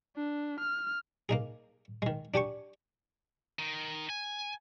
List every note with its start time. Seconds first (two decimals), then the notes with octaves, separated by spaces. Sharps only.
0.16 D4
0.60 F6
1.29 A#3 D#4 G#4
2.02 D#3 G#3
2.34 D4 G4 G#5 C#6
3.59 D#3
4.10 G#5